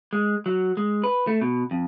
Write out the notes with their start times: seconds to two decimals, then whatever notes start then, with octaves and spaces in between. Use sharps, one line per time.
0.13 G#3
0.46 F#3
0.77 G#3
1.04 B4
1.27 A3
1.41 B2
1.71 F2